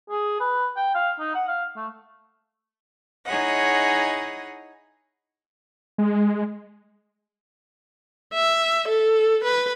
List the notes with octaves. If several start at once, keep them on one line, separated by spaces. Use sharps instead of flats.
G#4
B4
G5
F5
D#4
F#5
F5
A3
D#4 E4 G#4 C#5 D#5 F#5
G#3
E5
A4
B4